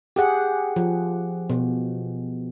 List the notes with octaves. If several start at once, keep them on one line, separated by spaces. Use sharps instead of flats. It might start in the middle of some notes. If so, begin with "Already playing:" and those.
G4 G#4 F#5
F3
B2